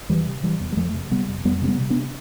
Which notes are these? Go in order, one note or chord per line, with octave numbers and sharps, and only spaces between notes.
E2 E3 G3
C3
C3 E3 G3
E2
G3
F2 F3 A3
C3
C3 G3 B3
F2
F2 G3 B3
C3 C4
G3 B3
C3
B3 D4